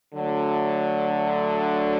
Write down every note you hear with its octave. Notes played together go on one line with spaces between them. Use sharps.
D3 F#3 A3